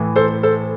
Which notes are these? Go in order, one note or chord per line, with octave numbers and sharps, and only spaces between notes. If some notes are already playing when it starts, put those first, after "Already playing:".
Already playing: A2 E3
A4 C5
A4 C5